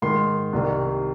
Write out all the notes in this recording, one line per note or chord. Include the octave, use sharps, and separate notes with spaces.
G#2 D#3 C6
C2 C3 D#3